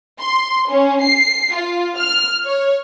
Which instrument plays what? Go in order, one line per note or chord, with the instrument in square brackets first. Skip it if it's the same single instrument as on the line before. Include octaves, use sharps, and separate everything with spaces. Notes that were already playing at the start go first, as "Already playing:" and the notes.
[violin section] C6
C#4
C7
F4
F6
C#5